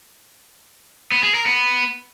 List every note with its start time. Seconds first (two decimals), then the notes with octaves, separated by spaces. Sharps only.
1.12 B3
1.23 G#4
1.34 A#4
1.46 B3